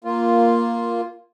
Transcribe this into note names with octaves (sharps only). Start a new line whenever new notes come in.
A#3 F4